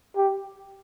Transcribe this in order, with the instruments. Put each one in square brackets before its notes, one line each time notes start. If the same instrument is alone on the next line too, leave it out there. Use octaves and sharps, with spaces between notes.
[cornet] G4